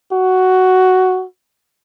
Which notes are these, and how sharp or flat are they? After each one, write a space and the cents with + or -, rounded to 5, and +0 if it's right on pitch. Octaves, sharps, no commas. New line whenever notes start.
F#4 +5